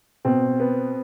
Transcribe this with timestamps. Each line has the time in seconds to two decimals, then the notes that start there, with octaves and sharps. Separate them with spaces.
0.25 B2 C4
0.60 B3